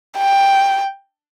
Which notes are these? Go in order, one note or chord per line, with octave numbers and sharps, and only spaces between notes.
G5